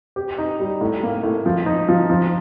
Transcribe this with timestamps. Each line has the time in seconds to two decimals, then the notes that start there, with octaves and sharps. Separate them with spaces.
0.16 G4
0.38 D#4
0.60 G3
0.81 A2
1.03 A#3
1.23 A2
1.46 F3
1.66 D#4
1.89 F3
2.10 F3